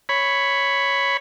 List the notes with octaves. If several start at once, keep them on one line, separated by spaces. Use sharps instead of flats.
C#5 B5